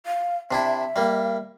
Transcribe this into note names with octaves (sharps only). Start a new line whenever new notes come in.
F5
C3 D4 E4 E5
G3 A#3